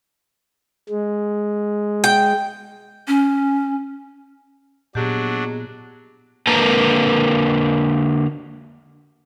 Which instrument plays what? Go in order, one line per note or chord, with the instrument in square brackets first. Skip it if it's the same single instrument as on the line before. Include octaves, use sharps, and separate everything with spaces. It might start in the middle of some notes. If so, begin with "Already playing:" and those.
[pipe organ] G#3
[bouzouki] G5
[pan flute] C#4
[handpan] A#2 [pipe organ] F#3 D4 [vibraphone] B3 G#4 D#5 [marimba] G4
[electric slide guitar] D3 A#3 A#4 B4 A5 A#5